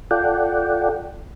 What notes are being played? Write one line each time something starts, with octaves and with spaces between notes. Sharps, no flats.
F4 A4 D5 F#5 G5